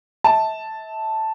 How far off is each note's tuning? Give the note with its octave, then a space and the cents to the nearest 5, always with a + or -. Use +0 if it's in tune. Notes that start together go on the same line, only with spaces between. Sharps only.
E5 -35 A5 +0